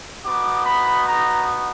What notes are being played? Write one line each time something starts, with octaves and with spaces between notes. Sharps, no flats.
B3 D#4 F#4 D6
B5
A#5